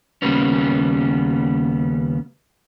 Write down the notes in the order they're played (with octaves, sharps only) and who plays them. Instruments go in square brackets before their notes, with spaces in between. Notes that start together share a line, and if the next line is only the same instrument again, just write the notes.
[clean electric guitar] D#2 C#3 G3 A#3 B3 C#4